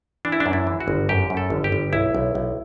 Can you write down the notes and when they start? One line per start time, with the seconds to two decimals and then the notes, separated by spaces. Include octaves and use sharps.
0.25 E3 D4
0.32 E4
0.40 D4
0.46 F#2
0.53 E4
0.67 E3
0.80 F#4
0.88 G1
1.09 F#2 G4
1.30 F#2
1.37 A4
1.50 G1
1.64 G4
1.72 G1
1.93 B1 E4
2.15 B1
2.35 B1